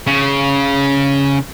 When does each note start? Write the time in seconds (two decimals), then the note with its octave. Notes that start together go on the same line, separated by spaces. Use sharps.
0.07 C#3